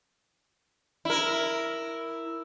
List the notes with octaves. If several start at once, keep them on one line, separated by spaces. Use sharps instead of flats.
E4 A#4